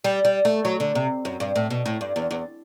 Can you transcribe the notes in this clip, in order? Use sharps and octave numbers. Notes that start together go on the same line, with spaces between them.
G3
G3
A3
F#3
D3
C3
F#2
G2
A2
B2
A2
G2
E2
E2